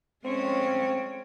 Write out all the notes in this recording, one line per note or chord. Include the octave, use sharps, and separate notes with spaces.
G#3 C4 C#4 C#5